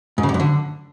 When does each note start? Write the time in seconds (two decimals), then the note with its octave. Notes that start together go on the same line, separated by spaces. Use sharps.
0.18 G#2
0.23 C#3
0.29 G2
0.34 F#2
0.40 D3